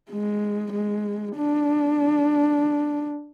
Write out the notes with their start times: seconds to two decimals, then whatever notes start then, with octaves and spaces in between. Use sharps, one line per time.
0.11 G#3
0.73 G#3
1.36 D4